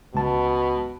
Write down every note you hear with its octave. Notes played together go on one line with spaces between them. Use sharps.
C#2 B2 A5